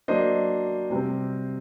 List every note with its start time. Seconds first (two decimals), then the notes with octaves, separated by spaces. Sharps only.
0.08 F#3 A#3 D4 C5 D#5
0.90 C3 G3 C4